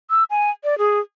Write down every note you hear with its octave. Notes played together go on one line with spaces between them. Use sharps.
E6
G#5
D5
G#4